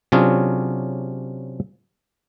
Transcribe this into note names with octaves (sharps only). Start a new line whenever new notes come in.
C3 F#3 C#4 D4 F4 G#4